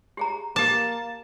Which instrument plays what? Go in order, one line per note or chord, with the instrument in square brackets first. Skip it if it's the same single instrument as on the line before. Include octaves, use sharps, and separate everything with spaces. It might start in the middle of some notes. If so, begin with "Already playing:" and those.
[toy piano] G4 G#4 A#5
[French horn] A#3 [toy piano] G4 D6 [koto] A5